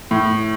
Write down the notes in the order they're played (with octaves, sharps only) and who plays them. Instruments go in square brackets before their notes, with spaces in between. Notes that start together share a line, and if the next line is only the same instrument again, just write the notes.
[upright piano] A2